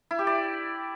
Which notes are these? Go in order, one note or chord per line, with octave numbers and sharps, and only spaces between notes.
E4
G4
D5